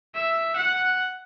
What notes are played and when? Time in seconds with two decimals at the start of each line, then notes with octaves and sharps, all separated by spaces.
0.15 E5
0.56 F#5